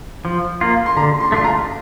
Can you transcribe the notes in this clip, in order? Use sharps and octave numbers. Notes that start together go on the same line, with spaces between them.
F3
A#3 F4
C6
D3 A#5
C6
A3 D4 F4 C6
A#5